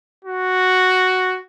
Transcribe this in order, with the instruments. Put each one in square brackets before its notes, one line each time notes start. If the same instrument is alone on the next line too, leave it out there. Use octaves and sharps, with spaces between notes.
[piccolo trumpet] F#4